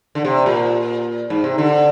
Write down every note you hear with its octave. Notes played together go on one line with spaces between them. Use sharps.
D3
C3
A#2
G#2
C3
D3